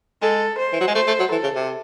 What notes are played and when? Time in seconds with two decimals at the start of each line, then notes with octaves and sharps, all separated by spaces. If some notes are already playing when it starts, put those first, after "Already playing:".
0.22 G#3 A4
0.58 C5
0.73 E3
0.80 F#3
0.87 G#3
0.95 A3 C5
1.07 A3
1.19 F#3
1.32 E3 A4
1.43 C#3
1.55 C3